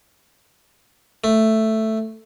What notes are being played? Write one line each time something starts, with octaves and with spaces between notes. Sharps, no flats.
A3